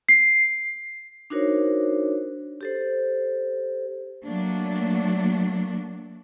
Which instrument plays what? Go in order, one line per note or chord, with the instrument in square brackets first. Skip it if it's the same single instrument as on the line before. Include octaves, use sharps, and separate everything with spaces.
[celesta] C7
[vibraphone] D4 D#4 F#4 A#4 C5 C#5
G4 A4 C5
[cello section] F#3 A3 A#3 D4